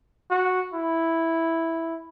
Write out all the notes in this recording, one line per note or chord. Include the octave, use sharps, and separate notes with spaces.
F#4
E4